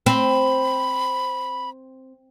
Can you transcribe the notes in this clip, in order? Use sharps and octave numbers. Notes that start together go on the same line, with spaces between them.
C4 B5